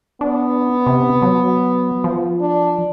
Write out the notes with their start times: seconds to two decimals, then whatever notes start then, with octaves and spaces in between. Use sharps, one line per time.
0.21 B3 D4
0.86 C3
1.22 F#3
2.04 F3
2.41 D4